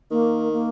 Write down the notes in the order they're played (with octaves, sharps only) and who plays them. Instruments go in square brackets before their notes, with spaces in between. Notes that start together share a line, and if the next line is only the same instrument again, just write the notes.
[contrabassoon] D#3 [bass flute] A#3
[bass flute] A#3